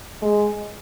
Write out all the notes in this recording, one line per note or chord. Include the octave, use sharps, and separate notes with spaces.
G#3